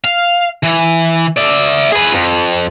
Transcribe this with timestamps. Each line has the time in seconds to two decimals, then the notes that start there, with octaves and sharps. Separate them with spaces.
0.04 F5
0.63 E3
1.37 D5 E5
1.92 G#4 B4
2.13 F2